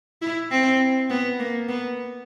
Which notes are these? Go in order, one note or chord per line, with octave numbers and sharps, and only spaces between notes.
E4
C4
B3
A#3
B3